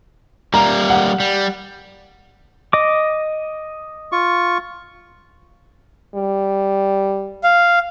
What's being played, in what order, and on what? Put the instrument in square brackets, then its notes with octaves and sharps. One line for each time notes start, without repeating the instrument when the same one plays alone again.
[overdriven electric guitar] G3 A#3 [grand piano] A#5
[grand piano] F#5
[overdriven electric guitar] G3
[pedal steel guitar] D#5 D6
[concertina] F4 C#6
[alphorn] G3
[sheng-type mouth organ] F5